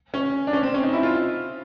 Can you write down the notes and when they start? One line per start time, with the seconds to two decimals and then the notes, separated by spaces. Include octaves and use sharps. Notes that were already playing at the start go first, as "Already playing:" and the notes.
0.14 C#4
0.47 D4
0.53 C#4
0.63 C4
0.74 C#4
0.83 D#4
0.93 E4
1.03 F4